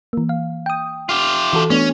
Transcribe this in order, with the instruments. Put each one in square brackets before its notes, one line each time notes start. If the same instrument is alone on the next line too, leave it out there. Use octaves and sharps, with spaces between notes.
[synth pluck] E3 A#3
F5
G5 D#6
[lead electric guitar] F4 G4
[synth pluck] E3 F#4 A4
[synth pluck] A3 B3 D4 [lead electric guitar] C#4